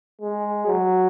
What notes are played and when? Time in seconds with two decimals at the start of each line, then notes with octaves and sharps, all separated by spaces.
0.21 G#3
0.67 F#3